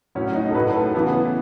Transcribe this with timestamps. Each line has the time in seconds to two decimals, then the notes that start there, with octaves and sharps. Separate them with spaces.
0.15 A2 F#3 C#4
0.35 D#4
0.51 A4
0.55 A2 F#3 B4
0.76 A4
0.95 C#3 E3 B3